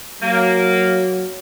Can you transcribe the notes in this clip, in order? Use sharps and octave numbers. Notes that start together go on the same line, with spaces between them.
F#3 A#3